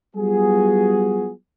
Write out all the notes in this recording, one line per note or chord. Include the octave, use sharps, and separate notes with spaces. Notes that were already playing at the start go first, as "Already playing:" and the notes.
F#3 G3 B3 F4 F#4 G#4